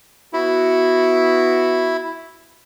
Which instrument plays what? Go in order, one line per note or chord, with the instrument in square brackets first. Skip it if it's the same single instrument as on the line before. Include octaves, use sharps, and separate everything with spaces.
[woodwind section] B3 F#4 [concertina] E4